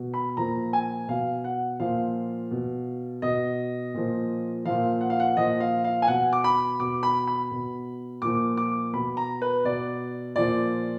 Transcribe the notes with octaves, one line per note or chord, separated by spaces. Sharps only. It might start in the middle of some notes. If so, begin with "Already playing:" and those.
Already playing: B2
B5
A#2 F3 A#5
G#5
B2 F5
F#5
A#2 F3 F5
B2
B2 D#5
A#2 F3
A#2 F3 F5
F#5
F5
F#5
A#2 F3 D#5
F5
F5
G#5
B2 F#5
D6
B5
B2 D6
B5
B5
B2
A#2 F3 D6
D6
B2 B5
A#5
B4
B2 D5
A#2 F3 D5